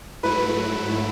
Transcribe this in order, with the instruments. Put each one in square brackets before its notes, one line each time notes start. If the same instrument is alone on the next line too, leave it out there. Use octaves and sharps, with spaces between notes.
[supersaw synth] G#2 F#3 A3 E4 [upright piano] B4